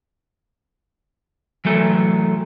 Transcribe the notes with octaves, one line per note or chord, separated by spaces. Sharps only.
E3 F#3 A3